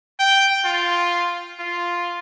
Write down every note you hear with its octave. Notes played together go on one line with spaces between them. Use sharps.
G5
F4
F4